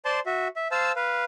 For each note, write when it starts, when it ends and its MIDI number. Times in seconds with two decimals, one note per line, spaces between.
0.05 0.20 72
0.05 0.20 74
0.05 0.20 81
0.05 0.20 84
0.26 0.48 66
0.26 0.48 76
0.56 0.68 76
0.71 0.92 72
0.71 0.92 77
0.71 0.92 81
0.71 0.92 88
0.96 1.25 71
0.96 1.25 77